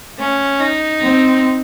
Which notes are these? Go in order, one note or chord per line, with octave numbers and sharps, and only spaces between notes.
A3 C#4
D#4
C4